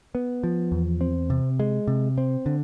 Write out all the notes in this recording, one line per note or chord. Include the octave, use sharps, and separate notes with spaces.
B3
F3
E2
C4
C3
G#3
C3
C4
D3